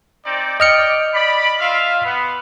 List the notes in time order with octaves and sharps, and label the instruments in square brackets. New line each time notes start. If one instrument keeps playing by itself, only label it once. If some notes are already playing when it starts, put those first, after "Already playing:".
[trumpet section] C4 D#4 D5
[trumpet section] D5 G5 [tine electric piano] D#5 F6 C#7
[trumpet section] D5 B5
F4 E5 F5
B3